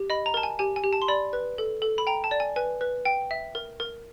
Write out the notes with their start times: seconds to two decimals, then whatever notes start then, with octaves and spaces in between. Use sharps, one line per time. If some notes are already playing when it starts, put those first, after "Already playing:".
Already playing: G4
0.10 D#5 B5
0.26 A#5
0.34 A#4 A5
0.43 G#5
0.59 G4 G#5
0.76 G#5
0.84 G4
0.93 A5
1.02 C6
1.08 D5 B5
1.33 B4
1.58 A4
1.82 A4
1.98 B5
2.07 G5 A#5
2.24 A5
2.31 D5
2.40 G#5
2.56 B4 G#5
2.81 B4
3.05 G5
3.31 E5
3.55 A#4
3.80 A#4